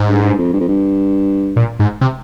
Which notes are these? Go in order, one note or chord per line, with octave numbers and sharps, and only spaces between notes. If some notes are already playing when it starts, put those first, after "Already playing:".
Already playing: G#2
G2
G2
F2
G2
F2
G2
A#2
G#2
C3